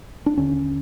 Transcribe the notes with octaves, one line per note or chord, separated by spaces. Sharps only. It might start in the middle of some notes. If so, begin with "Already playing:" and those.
D4
D#2 D3 C#4